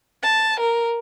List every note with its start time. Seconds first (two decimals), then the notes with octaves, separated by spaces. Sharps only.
0.23 A5
0.60 A#4